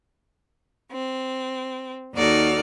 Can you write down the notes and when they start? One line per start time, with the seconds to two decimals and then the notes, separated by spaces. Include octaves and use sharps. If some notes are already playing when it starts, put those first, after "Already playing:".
0.92 C4
2.15 D#2 D#4 F#4 A4 D5 F6